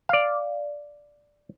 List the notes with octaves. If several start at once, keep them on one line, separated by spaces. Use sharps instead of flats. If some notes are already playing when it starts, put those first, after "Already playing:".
D5 F5